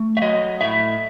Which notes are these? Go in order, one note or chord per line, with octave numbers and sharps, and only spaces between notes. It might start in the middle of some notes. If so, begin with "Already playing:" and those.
Already playing: A3
E5
F#3 D#5
A2 E5